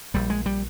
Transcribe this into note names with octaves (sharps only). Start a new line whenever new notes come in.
A#1 A#2 G3
G#3
G3